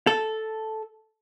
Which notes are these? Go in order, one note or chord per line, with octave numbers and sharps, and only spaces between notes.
A4